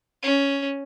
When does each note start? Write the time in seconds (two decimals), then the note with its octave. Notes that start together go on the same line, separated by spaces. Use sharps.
0.22 C#4